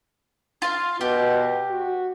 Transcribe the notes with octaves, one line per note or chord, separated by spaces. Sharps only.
F4 F5
B2 G4
F#4